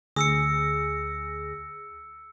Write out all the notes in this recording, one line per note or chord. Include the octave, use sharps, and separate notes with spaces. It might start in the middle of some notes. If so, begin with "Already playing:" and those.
D2 G#4 D#6 E6 A#6 C#7